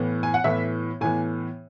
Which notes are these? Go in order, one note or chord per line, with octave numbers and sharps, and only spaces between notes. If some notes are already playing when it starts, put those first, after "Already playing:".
Already playing: A2 E3 B3
G#5
F#5
A2 E3 B3 E5
A2 E3 B3 G#5